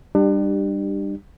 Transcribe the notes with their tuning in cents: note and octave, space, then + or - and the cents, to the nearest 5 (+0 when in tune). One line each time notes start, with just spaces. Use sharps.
G3 +15 D4 +35 G4 +0